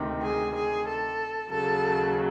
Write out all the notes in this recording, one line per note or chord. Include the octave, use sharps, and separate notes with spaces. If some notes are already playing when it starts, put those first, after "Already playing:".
Already playing: D2 C3 D#3
G#4
G#4
A4
D#2 C#3 F#3 A4